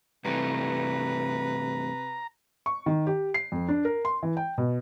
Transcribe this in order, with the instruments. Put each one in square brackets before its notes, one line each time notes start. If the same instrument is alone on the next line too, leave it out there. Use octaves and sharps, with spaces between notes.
[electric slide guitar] G2 E3 A3 [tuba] C3 [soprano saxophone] B4 [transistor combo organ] A#5
[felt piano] C#6
D#3
G4
C7
F2
D4
A#4
C6
E3
G5
B2